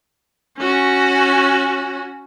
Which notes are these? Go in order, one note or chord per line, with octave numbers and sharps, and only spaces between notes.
C#4 F#4